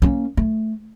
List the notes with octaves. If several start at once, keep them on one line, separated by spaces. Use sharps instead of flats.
A#3 C#4
A3